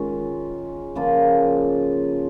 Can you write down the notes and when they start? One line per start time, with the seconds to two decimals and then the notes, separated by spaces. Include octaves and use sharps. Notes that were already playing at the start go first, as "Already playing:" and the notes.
Already playing: D#3 G#3 C#4 F4
0.96 C#3 F3 A#3 F4